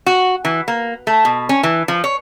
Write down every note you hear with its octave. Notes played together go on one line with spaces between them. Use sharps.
F#4
E3
A#3
A3
B2
C#4
E3
F3
C#5